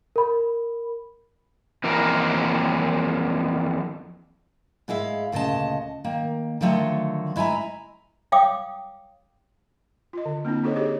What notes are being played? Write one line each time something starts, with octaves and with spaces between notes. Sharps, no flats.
A#4 B5
F2 E3 A#3 F#4 A#4
G#2 G#3 E4 F5
D2 A#2 C#3 D#5 A5
D#3 A#3
D3 D#3 F3 F#3 A3
G#3 E4 E5 G#5 A#5
C#5 F5 G5 D6 D#6
F4 D#5
D3
A#3 C4 D4 E4
D#4 F#4 A4 C5 C#5 D#5
G4 G#4 C#5 D#5